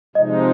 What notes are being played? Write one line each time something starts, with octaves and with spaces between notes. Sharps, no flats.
C3 F3 G#3 D#4 D#5